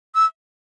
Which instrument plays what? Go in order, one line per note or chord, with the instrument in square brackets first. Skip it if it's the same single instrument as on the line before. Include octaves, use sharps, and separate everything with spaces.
[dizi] E6